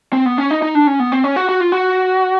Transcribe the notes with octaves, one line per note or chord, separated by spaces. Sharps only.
C4
B3
C#4
D#4
D#4
D4
C#4
B3
C4
C#4
F#4
F#4
F4
F#4